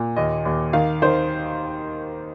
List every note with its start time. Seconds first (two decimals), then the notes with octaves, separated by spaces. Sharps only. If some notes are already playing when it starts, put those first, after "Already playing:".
Already playing: A#2
0.16 D#2 D#5
0.45 D#2
0.73 D#3 F5
1.02 D#3 C5